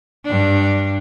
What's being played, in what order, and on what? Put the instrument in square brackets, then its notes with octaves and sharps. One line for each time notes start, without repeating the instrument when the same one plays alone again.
[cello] G2 D4